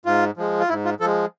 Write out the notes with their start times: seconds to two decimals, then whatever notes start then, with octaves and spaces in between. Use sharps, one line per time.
0.06 G#2 F4
0.37 F3 G#3
0.60 F4
0.69 G#2 E4
0.85 F4
1.00 F3 A4
1.05 G#3